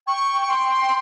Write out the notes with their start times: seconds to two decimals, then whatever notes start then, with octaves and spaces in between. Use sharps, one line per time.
0.07 G5 C#6
0.41 C#6
0.50 C6